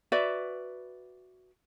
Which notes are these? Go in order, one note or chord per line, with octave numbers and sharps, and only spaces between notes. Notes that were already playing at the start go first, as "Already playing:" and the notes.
F#4 B4 D5 E5